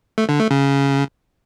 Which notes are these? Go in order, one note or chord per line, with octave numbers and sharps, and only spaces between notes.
A3
D3
A3
C#3